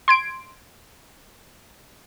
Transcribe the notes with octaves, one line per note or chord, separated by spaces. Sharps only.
C6 G#6 D7